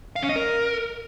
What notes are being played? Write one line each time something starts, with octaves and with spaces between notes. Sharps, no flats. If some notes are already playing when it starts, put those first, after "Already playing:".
F5
C#4
D#5
A#4